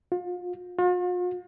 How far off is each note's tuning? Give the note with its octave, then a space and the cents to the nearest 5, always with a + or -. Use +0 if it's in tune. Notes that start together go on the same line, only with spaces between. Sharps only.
F4 +35
F4 +45